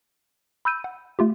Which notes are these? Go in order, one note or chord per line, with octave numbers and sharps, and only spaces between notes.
B5 E6 G6 D#7
F#5
A3 F4 G4